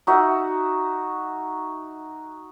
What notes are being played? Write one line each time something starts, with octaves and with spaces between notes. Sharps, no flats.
D#4 F#4 E5